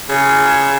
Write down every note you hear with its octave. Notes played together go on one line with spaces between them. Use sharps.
C#3